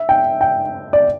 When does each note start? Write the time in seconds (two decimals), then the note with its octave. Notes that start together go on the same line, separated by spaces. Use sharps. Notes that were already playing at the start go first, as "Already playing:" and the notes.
Already playing: E5
0.09 G5
0.41 G5
0.93 D5